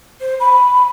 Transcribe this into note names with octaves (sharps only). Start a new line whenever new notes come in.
C5
B5